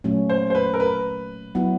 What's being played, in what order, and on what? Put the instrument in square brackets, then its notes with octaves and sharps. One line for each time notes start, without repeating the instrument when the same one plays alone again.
[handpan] A#2 F#3 A3 C#4
[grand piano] C5
C5
B4
A#4
B4
[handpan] F#3 B3 E4